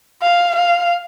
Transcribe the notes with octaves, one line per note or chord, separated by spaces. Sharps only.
F5
F5